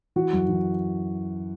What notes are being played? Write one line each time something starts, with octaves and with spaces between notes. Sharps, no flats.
E3 F#4
F#2
E3